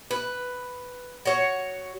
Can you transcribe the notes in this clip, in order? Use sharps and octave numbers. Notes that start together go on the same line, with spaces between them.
B4
F#4 C#5